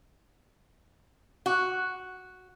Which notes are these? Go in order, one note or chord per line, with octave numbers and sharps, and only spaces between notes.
F#4